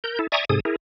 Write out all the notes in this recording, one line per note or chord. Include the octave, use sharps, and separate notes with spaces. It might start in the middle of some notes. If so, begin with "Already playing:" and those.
A#4 G6
E4 A4
D5 E5 G#5 A#5 C#6 D#6
G#2 C3 G#4 A4 D#6
E4 G#4 A#4